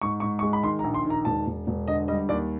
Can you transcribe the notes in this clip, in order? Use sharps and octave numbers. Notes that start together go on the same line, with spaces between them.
G#2 C#6
G#2 C#6
C#6
G#3
B5
D#3 C6
A#5
A#1
C6
D#3
A#5
E1 A5
E1
E1
D3 D#5
G3 D#5
D#2 D5